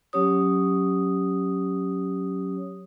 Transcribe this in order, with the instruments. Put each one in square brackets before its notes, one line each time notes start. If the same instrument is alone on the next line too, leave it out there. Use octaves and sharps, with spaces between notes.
[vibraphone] F#3 C#4 G4 C#5 D#6